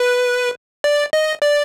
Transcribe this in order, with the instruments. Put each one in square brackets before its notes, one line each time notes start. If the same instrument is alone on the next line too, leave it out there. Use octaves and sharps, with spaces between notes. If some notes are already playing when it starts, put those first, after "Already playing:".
Already playing: [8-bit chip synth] B4
D5
D#5
D5